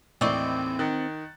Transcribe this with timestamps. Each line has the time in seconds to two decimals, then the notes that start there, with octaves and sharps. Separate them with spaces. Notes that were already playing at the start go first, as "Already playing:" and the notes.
0.21 D#2 A2 E3 C4 D5 D#5 C#6
0.79 D#3 F#6 A6 C#7